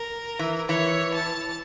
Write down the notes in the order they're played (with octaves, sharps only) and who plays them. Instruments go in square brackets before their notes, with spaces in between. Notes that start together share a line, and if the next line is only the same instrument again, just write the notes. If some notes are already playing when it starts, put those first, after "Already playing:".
Already playing: [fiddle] A#4
[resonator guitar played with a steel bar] E3
[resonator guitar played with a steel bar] E3 [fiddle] C#5
[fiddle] A5